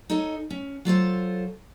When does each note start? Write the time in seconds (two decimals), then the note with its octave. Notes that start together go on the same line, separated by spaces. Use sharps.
0.10 D#4 A4 C#5 D#5 G#5
0.50 C#4
0.85 F#3 F4 A4 C5